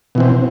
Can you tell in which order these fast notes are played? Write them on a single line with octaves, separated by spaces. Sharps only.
B2 E3 C4